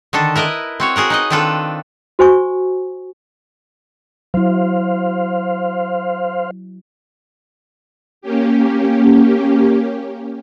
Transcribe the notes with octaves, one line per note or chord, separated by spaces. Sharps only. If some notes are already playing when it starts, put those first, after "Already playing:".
D3 D#3 D4 A4
E4 A#4 B4 D#5
C4 F#4 C#5
F#4 G#4 A#4 F#5
D#4 B4 D#5
D#3 C4 D4 F4 A4 B4
F#4 C5 G#5 C#6
F#3 E4 C5 F5
A#3 C#4 G4